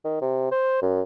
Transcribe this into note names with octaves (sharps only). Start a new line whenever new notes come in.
D#3
C3
C5
F#2